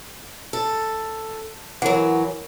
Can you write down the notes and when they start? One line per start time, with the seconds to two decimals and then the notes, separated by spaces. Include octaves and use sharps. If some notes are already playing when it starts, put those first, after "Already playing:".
0.53 A4
1.82 E3 F#3 A#4 F#5